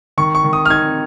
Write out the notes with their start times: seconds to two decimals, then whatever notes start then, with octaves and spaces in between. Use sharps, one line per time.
0.18 D#3 C#6
0.35 C#6
0.44 D#3
0.53 D#6
0.65 F6
0.70 D#4 G#6